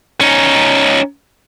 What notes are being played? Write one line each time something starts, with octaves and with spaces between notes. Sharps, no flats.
C#4 D#4